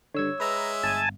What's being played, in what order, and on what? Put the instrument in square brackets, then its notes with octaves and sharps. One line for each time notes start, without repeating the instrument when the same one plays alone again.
[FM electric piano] G2 D3 [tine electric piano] C#5 E6 G#6
[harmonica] G#3 E5 [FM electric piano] B4 A#5
[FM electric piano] G1 [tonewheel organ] G#5 A5